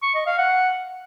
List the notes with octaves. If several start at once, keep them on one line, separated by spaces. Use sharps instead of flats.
C#6
D#5
F5
F#5